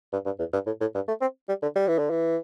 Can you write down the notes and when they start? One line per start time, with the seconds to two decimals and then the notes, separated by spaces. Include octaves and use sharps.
0.13 G2
0.25 G2
0.39 E2
0.53 G2
0.66 A2
0.81 A2
0.95 G2
1.08 A3
1.21 C4
1.48 G3
1.62 D3
1.76 G3
1.88 E3
1.98 D3
2.10 E3